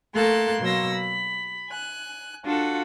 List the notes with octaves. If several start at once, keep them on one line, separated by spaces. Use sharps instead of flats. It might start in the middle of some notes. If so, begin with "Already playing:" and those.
A3 A#3 A4 C6 F#6
B2 F#3 A#3 C6 E6 A#6
B5
G#5 F#6
D4 F4 F#4 A4